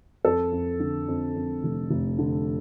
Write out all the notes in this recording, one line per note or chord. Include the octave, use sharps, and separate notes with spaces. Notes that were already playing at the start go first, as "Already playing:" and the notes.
F2 A4
F2
D3
F2
F2
F1
F1
D3